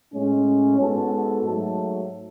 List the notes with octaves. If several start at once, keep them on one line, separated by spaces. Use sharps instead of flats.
A2 G#3 C#4
G#2 G#3 B3 F#4 A4
G#2 F#3 A3